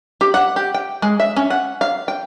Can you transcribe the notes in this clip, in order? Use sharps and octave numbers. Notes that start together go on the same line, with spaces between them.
G4
F#5
G4
G5
G#3
E5
C#4
F#5
F5
G5